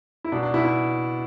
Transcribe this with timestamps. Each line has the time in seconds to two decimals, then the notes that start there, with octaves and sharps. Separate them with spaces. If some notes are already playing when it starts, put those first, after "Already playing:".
0.25 E4
0.32 B2 D4
0.43 D4
0.54 B2 E4
0.65 E4